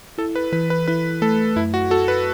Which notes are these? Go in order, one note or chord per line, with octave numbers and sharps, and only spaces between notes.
E4 A4
B4
E3 B4
B4
E4 B4
A3 A4
F#2 E4
F#4
F#4 A4
B4